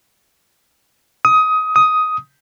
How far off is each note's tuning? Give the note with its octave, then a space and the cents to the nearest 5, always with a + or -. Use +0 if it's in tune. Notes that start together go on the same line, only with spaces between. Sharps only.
D#6 +20
D#6 +10